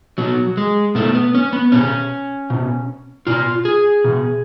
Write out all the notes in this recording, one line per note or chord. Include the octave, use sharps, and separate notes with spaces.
B2 F#3
G#3
B2 A3
B3
C#4
B3
B2 C#4
B2
B2 F4
G#4
B2